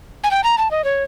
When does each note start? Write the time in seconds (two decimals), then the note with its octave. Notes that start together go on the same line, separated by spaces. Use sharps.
0.24 G#5
0.31 G5
0.44 A#5
0.58 A5
0.71 D#5
0.84 C#5